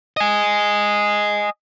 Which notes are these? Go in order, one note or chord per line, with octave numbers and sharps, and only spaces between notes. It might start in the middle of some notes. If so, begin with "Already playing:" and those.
D#5 G#5